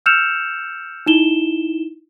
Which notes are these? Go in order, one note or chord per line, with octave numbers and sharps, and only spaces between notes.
E6 F6 G6 C#7 E7 F7
D#4 E4 E7 G7